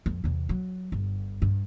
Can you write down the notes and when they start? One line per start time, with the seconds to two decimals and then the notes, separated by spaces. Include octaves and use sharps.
0.06 F2
0.24 E2 C3
0.49 F#3
0.92 G1
1.42 G2